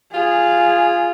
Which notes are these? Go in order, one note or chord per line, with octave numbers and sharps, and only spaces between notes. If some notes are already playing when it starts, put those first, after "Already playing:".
F4 G#4